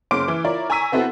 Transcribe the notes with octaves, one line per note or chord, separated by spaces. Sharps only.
F#1 C#4 C6 D6 F6 D7
E3
E4 F4 A#4 C#5 D5
G#5 A#5 C#6 E6 B6 D#7
B3 C4 E4 F#4 A4